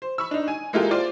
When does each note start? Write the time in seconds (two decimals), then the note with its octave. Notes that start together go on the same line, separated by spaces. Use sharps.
0.02 C5
0.18 B5 C#6 E6
0.31 D4 D#4
0.48 G#5
0.73 G#3 A#3 E4 F4 G4 A4
0.91 F4 C5 D5